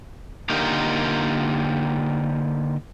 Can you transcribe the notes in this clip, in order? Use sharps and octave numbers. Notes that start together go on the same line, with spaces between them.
D3 A#3 D#4 F4 G4 A#4